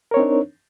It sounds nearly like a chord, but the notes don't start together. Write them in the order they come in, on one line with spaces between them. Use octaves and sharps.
A#4 C#5 C4 D#4 D4